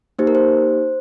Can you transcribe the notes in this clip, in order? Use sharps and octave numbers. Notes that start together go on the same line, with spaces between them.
A#3 D#4 G4 C5
A#4
C5